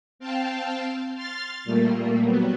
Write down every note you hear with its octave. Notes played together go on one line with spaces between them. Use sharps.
C4 F5 G5 A5
C6 F6 A6
A#2 G3 A3 A#3
F#3 G3 B3